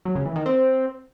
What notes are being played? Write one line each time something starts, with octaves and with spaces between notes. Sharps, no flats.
F#3
C#3
E3
D#3
C4